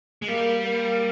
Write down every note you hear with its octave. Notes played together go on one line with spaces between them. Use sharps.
G#3
G3 A#3
A#3